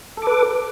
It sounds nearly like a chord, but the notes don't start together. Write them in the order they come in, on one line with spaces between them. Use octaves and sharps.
A4 D6 B4